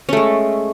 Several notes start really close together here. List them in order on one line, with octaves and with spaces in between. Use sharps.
C#4 A3 G#3